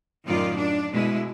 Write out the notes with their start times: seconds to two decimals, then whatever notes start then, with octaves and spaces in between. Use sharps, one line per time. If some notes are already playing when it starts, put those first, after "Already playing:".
0.24 F#2 A2 D#3 F4 D5
0.56 D4
0.91 B2 G#3 A3 E4